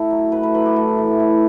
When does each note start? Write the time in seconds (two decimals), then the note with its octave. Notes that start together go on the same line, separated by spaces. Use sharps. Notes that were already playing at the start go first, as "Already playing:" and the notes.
Already playing: A2 E4 A4
0.11 F#3
0.32 A2 B4
0.43 B4
0.54 F#3 B4
0.66 G4
0.76 A2 A4
0.98 E3
1.20 A2